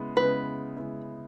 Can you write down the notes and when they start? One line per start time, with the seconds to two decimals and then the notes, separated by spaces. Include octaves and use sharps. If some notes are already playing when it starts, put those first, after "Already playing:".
Already playing: C#3 G#3 B3 E4
0.16 C#3 G#3 B3 E4 B4
0.77 C#3 G#3 B3 E4